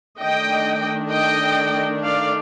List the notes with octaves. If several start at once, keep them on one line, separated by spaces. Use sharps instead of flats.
D#3 A3 D4 D#5 G5
D#5 G5
D5 F5